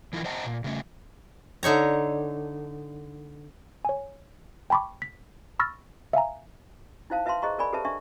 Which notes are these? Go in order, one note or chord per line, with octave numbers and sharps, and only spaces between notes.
E3 E4 F4 A4 A#4
C5 D#5 F#5 A5 A#5
A#2
C#3 A3 C#4
D3 D#4 C#5 A#5
C#5 G#5
G5 A5 B5 C#6 D6
B6
B5 C#6 E6 F6 A6 A#6
E5 F5 G#5 A#5
D#4 E4 C5 F5 A5
B4 E5 F5 A5 C6
G#4 C5 D#5 A#5 C#6
G#4 A#4 D5 G#5 B5
G4 A4 B4 C5 E5 A5
D4 E5 C#6